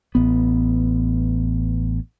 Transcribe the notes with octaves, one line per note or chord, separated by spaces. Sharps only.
A1 B3